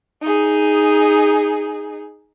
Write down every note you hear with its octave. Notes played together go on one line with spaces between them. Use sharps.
D#4 G#4